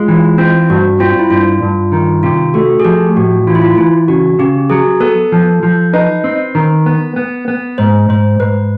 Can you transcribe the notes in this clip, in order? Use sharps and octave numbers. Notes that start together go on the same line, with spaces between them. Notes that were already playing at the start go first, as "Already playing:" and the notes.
Already playing: G#3 F4
E3
C4 F4
G2 F#4
C4 F4
E4
G2 F4
G2
D#3
C3 F4
A3 F#4
G#4
F3 G4
A2 F#4
E3 F4
E4
F4
E3 E4
C#3 F#4
C#3 G4
F#3 G#4
B3 A4
F3
F3
D#4 B4
C4
D#3
B3
B3
B3
G#2 C5
G#2 C5
G#2 B4